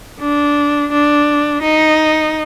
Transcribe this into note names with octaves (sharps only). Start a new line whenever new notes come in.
D4
D4
D#4